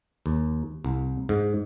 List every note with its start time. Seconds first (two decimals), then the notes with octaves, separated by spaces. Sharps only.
0.26 D#2
0.85 C2
1.29 G#2